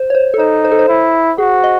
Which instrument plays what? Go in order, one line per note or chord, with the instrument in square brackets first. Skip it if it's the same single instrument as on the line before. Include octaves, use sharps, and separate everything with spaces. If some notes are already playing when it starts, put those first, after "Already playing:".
Already playing: [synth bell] C5
C#5
C5
A4
[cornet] D#4 [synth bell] C5
[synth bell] C5
A4
C5
[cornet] E4
[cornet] F#4 [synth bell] G#4
[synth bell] D#5